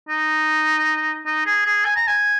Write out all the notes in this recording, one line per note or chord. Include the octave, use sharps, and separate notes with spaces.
D#4
D#4
G#4
G#4
G#5
A#5
G#5